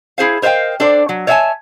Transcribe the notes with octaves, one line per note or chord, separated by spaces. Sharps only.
E4 G#4 C5 F5
A#4 C5 D#5 F5 G5
D4 A4 C5 D5
F#3
C#5 D5 E5 F#5 G#5 A5